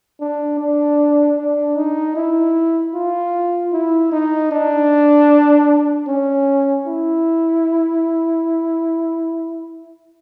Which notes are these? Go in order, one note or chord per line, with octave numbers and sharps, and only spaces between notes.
D4
D4
D4
D#4
E4
F4
E4
D#4
D4
C#4
E4